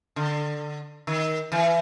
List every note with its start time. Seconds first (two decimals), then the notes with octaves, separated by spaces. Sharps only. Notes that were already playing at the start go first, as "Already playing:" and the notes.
0.16 D3
1.07 D#3
1.52 E3